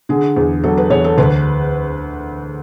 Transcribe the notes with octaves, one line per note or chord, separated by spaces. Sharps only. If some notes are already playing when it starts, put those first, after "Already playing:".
D3 G#4
E2
F#3 A4
B4
E2 C#5
A4
D2 B4